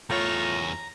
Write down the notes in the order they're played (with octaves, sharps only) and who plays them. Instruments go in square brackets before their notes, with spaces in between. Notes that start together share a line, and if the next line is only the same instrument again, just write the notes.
[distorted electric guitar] E2 C#5 [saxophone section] A3 F4 [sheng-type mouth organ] A#5